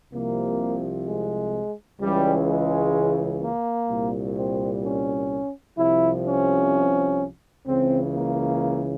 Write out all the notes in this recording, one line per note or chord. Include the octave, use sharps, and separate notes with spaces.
C2 C3 F3 A#3
G#3
C#2 C#3 E3 G3
G#3
A#3
C2 A#2 G3
C4
C#4
C2 C3 F3 E4
C#4
C#2 C#3 E3 C4
A#3